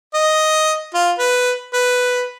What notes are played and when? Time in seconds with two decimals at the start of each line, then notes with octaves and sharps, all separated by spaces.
0.14 D#5
0.95 F4
1.19 B4
1.74 B4